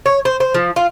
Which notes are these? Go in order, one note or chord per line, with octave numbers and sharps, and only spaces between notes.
C#5
C5
C5
F3
F4